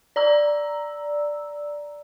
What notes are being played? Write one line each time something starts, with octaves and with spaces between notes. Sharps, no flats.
D5 A#5 E6